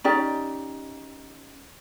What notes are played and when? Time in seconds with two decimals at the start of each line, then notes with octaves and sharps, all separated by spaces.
0.04 C#4 D#4 G4 D5